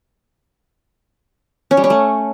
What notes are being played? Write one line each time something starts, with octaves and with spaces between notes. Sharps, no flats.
C#4
G3
C#4
A3